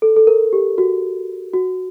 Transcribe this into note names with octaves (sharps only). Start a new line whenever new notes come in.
A4
A4
A#4
G4
F#4
F#4